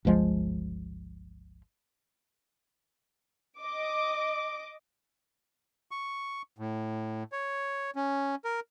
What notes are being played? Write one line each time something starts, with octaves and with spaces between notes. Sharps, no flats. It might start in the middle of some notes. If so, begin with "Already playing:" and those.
G1 C#2 F3 G#3
D#5 D6
C#6
A2
C#5
C#4
A#4